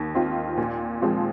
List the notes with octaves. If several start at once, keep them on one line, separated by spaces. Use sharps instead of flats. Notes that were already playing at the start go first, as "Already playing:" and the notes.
Already playing: D#2
D#3 C4 F4
A#2
F3 G#3 C4 F4